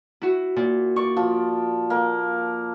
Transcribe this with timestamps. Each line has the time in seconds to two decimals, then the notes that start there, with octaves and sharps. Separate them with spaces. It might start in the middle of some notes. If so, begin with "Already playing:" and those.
0.22 E4 F#4
0.56 A#2
0.96 D5 C#6
1.17 F3
1.90 A#3